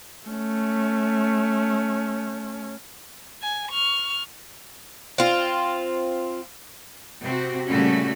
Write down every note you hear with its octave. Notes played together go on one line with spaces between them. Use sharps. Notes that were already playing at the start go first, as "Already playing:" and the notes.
A3 C#4
G#5
C#6 F6
C4 F4
C3 C4 F#4
A#2 C#3 G3 A3 C#4 F#4